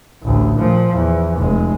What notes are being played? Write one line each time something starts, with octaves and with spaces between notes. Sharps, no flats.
A1 D2
A#2 F3
E2
F1 G#3